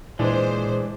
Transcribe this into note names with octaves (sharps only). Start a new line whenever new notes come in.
A#2 E3 G#3 D4 C5